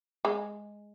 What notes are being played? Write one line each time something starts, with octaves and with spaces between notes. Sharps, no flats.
G#3